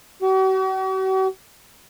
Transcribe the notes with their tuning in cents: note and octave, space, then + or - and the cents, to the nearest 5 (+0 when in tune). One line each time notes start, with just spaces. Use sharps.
F#4 +45